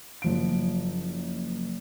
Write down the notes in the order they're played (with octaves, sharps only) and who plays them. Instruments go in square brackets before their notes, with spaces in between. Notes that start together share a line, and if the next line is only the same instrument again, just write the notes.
[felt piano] F#1 F3 D7